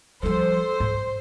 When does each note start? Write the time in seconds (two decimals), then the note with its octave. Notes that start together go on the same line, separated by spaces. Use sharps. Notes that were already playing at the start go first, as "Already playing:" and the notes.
0.23 F3 G3 A4 C5
0.80 G#2